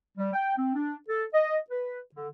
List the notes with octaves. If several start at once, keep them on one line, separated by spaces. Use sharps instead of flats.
G3
G5
C4
D4
A4
D#5
B4
D3